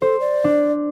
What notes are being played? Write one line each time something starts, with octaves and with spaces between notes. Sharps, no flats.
A4 C5
D5
D4